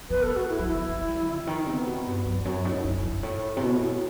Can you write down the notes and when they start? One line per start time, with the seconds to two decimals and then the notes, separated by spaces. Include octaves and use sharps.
0.10 B3 B4
0.23 A4
0.30 A3
0.36 F#4
0.49 E4
0.59 G3
0.68 A3 E4
0.89 A3
1.08 G3
1.27 C3
1.47 D#3
1.66 C3 B3
1.86 B2
2.06 G2
2.26 F#2
2.37 E2
2.44 F#2 C4
2.65 A2 D#4
2.84 F#2 E4
3.03 G2
3.23 A2
3.57 C3
3.62 B2
3.81 A2